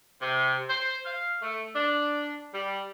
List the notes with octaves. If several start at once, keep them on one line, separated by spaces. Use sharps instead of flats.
C3
C5
F5
A3
D4
G3